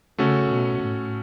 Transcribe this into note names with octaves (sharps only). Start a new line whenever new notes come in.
C#3 A3 C#4 F#4 A4
B2
A2